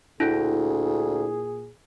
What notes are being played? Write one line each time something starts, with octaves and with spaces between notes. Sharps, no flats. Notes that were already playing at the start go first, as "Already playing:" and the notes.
D2 A#2 D4 E4 G#4